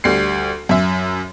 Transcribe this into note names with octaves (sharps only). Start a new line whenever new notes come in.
D2 G3 C7
F#2 E5